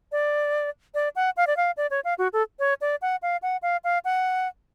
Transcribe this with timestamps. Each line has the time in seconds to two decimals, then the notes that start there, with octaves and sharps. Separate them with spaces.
0.12 D5
0.94 D5
1.16 F#5
1.37 F5
1.47 D5
1.57 F5
1.77 D5
1.91 C#5
2.04 F5
2.18 F#4
2.33 A4
2.59 C#5
2.81 D5
3.02 F#5
3.22 F5
3.42 F#5
3.62 F5
3.84 F5
4.05 F#5